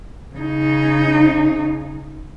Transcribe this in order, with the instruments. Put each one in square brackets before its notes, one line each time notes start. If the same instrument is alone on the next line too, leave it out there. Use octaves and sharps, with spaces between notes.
[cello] C#3 D#4